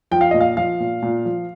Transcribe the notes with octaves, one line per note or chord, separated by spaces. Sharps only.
F3 G5
F5
A#2 D#5
F5
F3 F5
A#2
A#2
F3